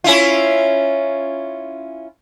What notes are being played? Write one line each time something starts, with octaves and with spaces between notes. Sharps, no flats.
C#4 E4 F4